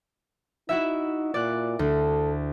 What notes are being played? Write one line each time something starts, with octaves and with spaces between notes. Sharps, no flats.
D#4 E4 F#4 E5
A#2 D5 F#6
D2 A4